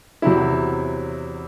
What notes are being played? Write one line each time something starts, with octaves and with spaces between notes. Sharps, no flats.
E2 C3 F#3 C4 E4